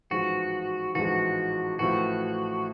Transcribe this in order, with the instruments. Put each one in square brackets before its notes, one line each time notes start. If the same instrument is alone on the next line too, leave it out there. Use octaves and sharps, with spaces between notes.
[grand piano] A1 G#2 F3 G#3 [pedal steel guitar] F#4
[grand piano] A1 G#2 F3 G#3 [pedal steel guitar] F#4
[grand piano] A1 A2 F3 A3 [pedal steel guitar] F#4